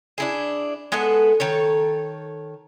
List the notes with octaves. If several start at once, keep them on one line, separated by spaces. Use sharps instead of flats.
D4 E4 G#4
G#3 B3 A4 F#5
D#3 A4 C#5